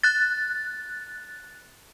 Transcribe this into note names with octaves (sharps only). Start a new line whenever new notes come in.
F#6 A6